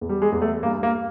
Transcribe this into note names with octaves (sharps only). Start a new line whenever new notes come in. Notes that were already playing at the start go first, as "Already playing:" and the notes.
E2
G3
G#3
E2
A3
G2 A#3
A#3